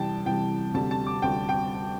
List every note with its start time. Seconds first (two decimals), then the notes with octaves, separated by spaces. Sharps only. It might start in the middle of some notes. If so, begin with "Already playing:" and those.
Already playing: C2 C3 E3 G3 G5 A5
0.25 C2 C3 E3 G3 G5
0.74 D2 C3 G3 A5
0.91 A5
1.06 D6
1.22 D2 C3 G3 G5
1.49 G5